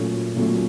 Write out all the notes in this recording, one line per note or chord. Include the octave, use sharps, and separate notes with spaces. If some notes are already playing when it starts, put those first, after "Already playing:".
Already playing: A#2 F#3 A3 C#4
A#2 F#3 A3 C#4